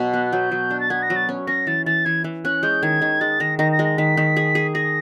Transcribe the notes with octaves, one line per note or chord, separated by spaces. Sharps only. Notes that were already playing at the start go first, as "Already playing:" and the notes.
Already playing: B2 F#3
B3 F#6
F#6
F#3 G6
F#3
D4
A6
B3 G#6
A#6
F#3
A6
C#4
C#4 A#6
E3 A6
E3 A6
E3 G#6
E3
C#4 F#6
G#3 G6
D#3 G#6
D#3
G#3 A6
D#3 A#6
D#3 A#6
A#6
G#3
A#6
D#3 B6
D#3
G#4
G#4
G#4 A#6